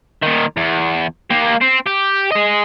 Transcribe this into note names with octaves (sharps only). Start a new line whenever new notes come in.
A#2 D#3
E2
A#3 G4
C4
G4
G#4 D#5